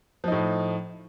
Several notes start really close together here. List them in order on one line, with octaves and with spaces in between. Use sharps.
F3 D#4 A2